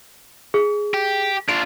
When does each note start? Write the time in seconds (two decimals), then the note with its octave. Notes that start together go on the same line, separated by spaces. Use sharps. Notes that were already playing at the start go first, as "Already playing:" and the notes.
0.54 G#4
0.94 G4
1.49 D4 F4 D7